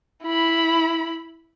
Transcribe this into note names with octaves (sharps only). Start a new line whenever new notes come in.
E4 B5